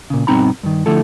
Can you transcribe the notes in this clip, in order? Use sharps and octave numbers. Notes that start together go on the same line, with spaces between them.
A#2 C#3
G2 B2 C4 D#4 A#5 B5
G2 D#3
D3 F3 A3 E4 A4